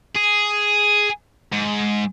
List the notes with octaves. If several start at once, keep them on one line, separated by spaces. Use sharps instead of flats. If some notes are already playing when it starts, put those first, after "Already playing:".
G#4
G#2